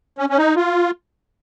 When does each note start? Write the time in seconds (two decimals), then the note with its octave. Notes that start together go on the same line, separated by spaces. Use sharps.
0.18 C#4
0.30 C#4
0.38 D#4
0.56 F4